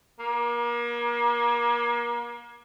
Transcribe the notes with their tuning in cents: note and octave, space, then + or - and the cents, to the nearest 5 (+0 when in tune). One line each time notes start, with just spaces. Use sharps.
A#3 +35